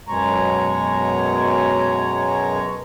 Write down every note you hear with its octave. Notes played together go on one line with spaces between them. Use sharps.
F#2 B2 G#3 C#5 A#5